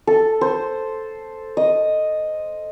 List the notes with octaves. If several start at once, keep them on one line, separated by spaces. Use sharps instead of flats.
A4
C5
D#5